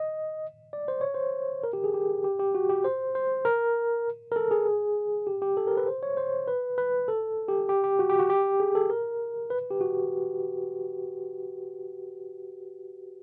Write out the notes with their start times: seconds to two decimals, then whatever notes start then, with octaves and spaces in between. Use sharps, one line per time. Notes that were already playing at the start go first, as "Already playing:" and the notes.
Already playing: D#5
0.73 D5
0.88 C5
1.01 C#5
1.14 C5
1.64 A#4
1.73 G4
1.84 G#4
1.94 G4
2.24 G4
2.39 G4
2.55 F#4
2.69 G4
2.84 C5
3.15 C5
3.45 A#4
4.32 A#4
4.36 A4
4.51 G#4
5.27 G4
5.42 G4
5.57 A4
5.67 A#4
5.77 B4
5.87 C5
6.03 C#5
6.17 C5
6.48 B4
6.78 B4
7.08 A4
7.48 G4
7.69 G4
7.84 G4
7.99 F#4
8.09 G4
8.19 F#4
8.30 G4
8.60 G#4
8.75 A4
8.90 A#4
9.50 B4
9.71 G4
9.81 F#4